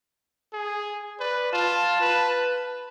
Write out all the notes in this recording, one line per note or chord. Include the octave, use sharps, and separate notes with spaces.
G#4
B4 D5
F4 A5
B4